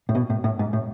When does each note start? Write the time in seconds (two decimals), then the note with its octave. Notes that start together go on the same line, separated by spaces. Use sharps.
0.09 A2
0.15 B2
0.30 A2
0.44 A2
0.59 G#2
0.73 A2